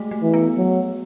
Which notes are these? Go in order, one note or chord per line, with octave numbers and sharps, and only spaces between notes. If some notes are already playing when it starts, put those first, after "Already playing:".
Already playing: G#3 A3 F#4 G#4
A3
E3
B3
F#3